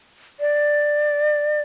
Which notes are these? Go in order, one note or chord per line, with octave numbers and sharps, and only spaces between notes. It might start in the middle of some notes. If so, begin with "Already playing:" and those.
D5